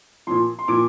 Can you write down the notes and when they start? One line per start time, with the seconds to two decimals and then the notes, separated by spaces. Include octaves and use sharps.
0.27 A#2 F3 C6
0.59 C6
0.68 A#2 F3 D6